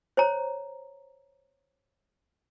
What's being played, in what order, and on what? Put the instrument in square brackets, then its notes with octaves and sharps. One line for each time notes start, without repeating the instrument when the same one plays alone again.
[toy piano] C5 C#5 A#5